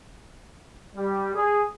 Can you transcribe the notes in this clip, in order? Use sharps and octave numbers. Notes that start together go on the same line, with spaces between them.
G3
G#4